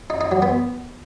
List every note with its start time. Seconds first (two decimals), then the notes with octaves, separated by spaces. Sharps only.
0.10 D#4
0.21 D#4
0.32 F#3
0.42 B3